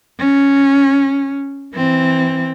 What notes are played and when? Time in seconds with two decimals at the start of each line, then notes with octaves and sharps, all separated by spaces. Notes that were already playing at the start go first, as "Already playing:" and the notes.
0.19 C#4
1.75 E3 C4